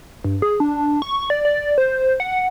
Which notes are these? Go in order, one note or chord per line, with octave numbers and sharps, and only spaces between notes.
G2
G#4
D4
C#6
D5
D5
C5
F#5